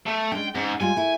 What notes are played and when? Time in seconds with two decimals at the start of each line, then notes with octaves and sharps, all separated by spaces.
0.06 A3
0.32 G#3 C#4 D4 G5
0.55 G#2 C4 C#4
0.81 G3 G#3 F4 G#5
0.96 A3 E4